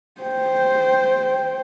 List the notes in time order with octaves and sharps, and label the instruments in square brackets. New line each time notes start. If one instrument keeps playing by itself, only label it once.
[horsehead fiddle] C5 G5